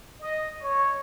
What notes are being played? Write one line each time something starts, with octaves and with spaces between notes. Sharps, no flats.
D#5
C#5